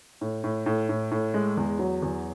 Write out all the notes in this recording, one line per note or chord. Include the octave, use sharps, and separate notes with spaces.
A2
A2
A2
A2
A2
G#3
E2
F#3
E2